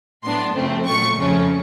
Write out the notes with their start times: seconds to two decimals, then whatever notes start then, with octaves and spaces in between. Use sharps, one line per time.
0.23 A2 F#3 B3 D4 C6
0.54 F#2 C#3 F3 A3 C4
0.86 A#2 F#3 A3 C#6
1.16 F2 C#3 F3 A3 C#4